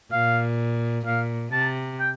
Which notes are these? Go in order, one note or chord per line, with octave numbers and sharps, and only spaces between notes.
A#2 F5
A#2 F5
C3 A5
G5